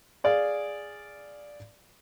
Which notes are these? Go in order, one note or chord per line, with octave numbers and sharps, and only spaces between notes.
G#4 D5 F5